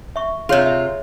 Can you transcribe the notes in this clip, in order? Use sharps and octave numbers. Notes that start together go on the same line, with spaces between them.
E5 C#6
C3 F4 G#4 C#5 E5
E5